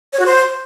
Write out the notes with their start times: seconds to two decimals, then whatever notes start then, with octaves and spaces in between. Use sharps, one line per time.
0.13 C#5
0.19 F#4
0.26 C5